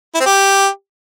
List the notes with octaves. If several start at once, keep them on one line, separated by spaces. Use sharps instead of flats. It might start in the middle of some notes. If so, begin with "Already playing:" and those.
E4
C4
G4